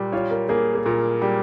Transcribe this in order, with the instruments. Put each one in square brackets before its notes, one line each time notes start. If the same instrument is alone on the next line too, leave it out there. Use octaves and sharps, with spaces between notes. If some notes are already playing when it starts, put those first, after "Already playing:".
Already playing: [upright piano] A#2 G3
[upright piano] F4 [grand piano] C#5
[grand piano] A#4
[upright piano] A#3 [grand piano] G#4
[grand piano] G#4
[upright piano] A#2 [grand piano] A#4
[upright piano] G3